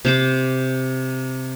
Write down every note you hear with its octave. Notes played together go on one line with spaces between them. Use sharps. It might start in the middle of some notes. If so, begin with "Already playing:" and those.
C3 C5 D6